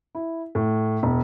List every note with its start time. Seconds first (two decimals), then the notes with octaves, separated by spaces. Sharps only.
0.15 E4
0.55 A2
1.03 E1